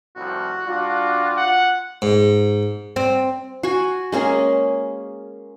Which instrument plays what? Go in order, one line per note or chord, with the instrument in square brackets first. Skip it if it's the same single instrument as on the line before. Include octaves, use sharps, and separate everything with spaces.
[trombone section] C2 A2 F3 [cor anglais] F#4
[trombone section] G3 D4 [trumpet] F4
[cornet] F#5
[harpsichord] G#2
[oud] C4
[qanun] F#4 G#5
G#3 A#3 C#4 G#4